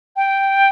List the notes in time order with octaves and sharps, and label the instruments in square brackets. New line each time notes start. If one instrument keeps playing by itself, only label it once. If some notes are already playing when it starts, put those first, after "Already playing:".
[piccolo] G5